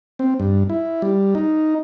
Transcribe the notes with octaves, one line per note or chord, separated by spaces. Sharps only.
C4
G2
E4
G3
D#4